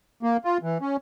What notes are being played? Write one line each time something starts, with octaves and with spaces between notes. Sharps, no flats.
A#3
F4
E3
C#4